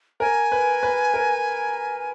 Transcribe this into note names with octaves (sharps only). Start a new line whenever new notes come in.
A#4 G#5
B4
B4
A#4